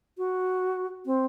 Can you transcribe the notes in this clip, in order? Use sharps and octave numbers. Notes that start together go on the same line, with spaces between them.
F#4
C4